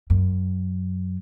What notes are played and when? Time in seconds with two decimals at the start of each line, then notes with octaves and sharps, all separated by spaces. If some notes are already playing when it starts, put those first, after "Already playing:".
0.10 F#2